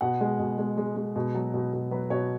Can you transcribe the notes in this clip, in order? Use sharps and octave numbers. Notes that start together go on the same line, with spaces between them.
B2 F#5
G#3
B2
G#3
G#3
G#3
B2
F#3
B2
B2
F#3 B4
B2 C#5